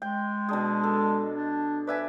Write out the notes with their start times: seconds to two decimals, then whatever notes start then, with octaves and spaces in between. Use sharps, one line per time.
0.02 G#3 G5
0.49 B2 D4 G#4
0.83 A4
1.34 D4
1.87 B4 D5 E5 G#5